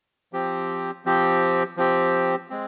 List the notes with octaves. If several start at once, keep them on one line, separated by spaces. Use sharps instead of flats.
F3 C4 G4
F3 C4 G4
F3 C4 G4
G#3 C4